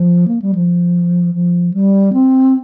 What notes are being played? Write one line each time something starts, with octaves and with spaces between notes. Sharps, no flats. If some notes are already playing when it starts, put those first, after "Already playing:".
Already playing: F3
A#3
G3
F3
F3
G3
C4